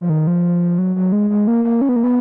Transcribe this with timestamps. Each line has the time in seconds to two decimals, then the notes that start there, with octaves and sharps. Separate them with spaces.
0.01 F3
0.09 D#3
0.27 F3
0.78 F#3
0.96 F#3
1.12 G#3
1.30 G#3
1.47 A#3
1.64 A#3
1.81 C#4
1.89 B3
1.96 A#3
2.04 B3